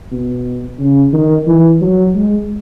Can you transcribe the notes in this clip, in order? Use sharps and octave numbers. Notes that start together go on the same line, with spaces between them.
B2
C#3
D#3
E3
F#3
G#3